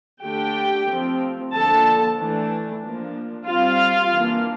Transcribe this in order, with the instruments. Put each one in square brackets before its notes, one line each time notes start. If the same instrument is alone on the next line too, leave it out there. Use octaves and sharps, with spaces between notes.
[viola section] D3 A3 D4 G4 G5
F3 A3 C4
D3 F3 A#3 D4 A4 A5
E3 A3 D4
F3 A#3 D4
G3 C4 F4 F5
E3 A#3 D4